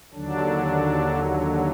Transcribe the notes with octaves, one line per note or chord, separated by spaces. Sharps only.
D#2 D3 F#3 D4